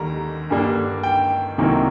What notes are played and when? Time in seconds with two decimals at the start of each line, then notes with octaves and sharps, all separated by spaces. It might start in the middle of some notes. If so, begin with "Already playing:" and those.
Already playing: D#2 D3 G3 A#3 A#5
0.50 G2 D3 G3 A#3 D4
1.03 G5
1.58 C2 C3 D#3 F#3 A#3